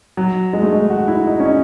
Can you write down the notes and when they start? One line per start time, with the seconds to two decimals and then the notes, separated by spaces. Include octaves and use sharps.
0.17 F#3
0.53 G#3
0.63 A3
0.73 G#3
0.90 F#4
1.08 E4
1.27 D#4
1.40 C#4
1.45 D#4